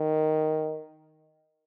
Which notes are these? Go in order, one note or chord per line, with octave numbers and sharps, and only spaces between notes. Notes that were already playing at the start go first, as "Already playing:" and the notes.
Already playing: D#3